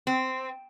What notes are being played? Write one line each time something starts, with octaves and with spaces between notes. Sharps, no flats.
C4